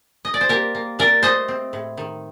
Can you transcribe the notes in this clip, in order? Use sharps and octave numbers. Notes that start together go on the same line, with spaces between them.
D#5
D5
C5
A#3 G4 A#4
A#3
D4 A#4 D5
A3 C5 D#5
C4
A2
D#3